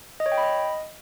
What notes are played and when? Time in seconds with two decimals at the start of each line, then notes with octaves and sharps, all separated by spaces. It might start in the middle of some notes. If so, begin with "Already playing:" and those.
0.20 D#5
0.26 C#5
0.32 G5
0.38 B5
0.43 D#5